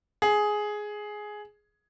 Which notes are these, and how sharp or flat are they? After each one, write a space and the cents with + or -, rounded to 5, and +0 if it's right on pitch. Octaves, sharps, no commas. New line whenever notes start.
G#4 +10